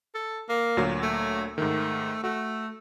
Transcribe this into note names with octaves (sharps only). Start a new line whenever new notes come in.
A4
A#3
D2 A#2 F#3
A3
G#2 D#3 A3
A3 F#4